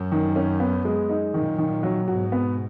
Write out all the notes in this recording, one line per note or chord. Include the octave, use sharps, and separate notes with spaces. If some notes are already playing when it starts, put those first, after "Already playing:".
Already playing: F#2
D#3
C#4
B3
G#3
D#4
F#2 A#2 D#3
D#3
F#3
G#2 B2 F#4
B3